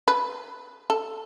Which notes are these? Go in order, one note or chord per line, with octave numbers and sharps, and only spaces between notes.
B4
A4